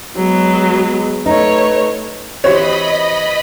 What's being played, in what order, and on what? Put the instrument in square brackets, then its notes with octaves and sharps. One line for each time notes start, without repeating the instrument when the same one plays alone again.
[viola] F#3 B3 [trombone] G#3
[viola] A3 C#5 [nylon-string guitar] D#4 [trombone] B4
[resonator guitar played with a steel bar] E3 C4 [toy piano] F#4 G4 C5 [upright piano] C#5 [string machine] D#5 B5